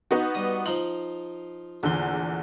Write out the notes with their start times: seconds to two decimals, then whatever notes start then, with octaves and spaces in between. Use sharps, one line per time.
0.11 B3 D#4 F#4
0.35 G3 D#6
0.66 F3 D#4 F4 F#7
1.83 A#1 E2 D3 C6